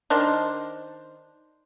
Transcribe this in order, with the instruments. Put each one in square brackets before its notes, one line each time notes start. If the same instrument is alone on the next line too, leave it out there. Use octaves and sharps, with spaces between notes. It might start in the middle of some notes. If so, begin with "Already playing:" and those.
[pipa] D#3 D4 C5